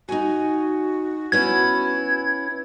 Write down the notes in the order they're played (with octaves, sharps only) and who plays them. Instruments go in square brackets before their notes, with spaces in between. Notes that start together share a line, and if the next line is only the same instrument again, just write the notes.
[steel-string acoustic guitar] D#4 G#5 [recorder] F#4
[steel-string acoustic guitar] B3 C#4 E4 [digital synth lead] G#6